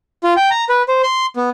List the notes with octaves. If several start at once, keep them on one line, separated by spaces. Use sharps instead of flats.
F4
G5
A#5
B4
C5
C6
B3